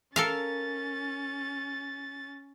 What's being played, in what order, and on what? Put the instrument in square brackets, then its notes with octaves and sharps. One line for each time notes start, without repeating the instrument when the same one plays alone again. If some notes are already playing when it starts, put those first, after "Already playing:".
[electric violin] C#4 A6 [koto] A4 A#4 F5